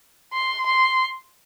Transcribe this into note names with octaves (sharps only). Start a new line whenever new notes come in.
C6
C6